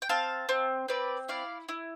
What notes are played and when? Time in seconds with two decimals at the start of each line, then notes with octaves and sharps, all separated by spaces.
0.02 G5
0.09 C4 F5 A5
0.49 C4
0.88 C4 B4 D5
1.28 E4 D5 F5
1.69 E4